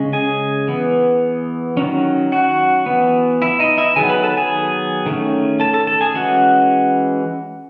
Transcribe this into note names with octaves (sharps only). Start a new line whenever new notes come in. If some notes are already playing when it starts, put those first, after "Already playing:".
Already playing: C#3 G#3 C#4
G#4 G#5
E3 B3
D#3 F#3 C#4
F#4 F#5
E3 B3
E4 E5
D#4 D#5
E4 E5
D#3 F#3 B3 G#4 G#5
B4 B5
A4 A5
G#4 G#5
D#3 A3 C#4
A4 A5
A4 A5
A4 A5
G#4 G#5
E3 G#3 C#4 F#4 F#5